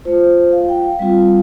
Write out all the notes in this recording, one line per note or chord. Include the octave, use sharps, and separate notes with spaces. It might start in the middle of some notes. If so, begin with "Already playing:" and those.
A3 F4 C5
F5
G5
F5
G3 C4 F4